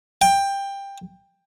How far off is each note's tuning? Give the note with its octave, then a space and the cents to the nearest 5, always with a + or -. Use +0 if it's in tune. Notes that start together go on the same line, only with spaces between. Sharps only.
G5 +15